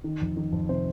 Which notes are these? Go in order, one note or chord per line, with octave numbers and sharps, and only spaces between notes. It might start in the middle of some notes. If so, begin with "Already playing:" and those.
D#3
F2
D#3
F2
C3 C5